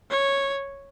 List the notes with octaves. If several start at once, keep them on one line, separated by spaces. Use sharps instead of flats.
C#5